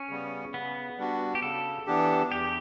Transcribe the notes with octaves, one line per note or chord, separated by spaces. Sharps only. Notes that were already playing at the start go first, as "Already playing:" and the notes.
Already playing: C#4
C#3 G3 B3
C#3 B3
G3 D4 F#4
G4
C#3 A4
E3 B3 D4 G4
E2 G4